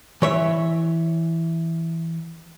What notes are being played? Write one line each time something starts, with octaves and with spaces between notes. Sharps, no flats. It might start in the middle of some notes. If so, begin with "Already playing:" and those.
E3 C#5 E5